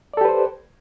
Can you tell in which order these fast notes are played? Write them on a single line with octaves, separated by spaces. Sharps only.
D5 A4 G4 B4 C5